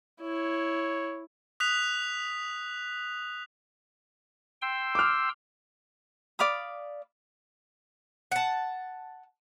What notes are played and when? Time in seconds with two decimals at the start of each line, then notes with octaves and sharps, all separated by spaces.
0.22 E4 C#5
1.60 D#6 F#6 B6 F7
4.62 G5 C6 E6
4.95 D6 F6
6.39 D5 F5 B5 D#6
8.32 F#5 A5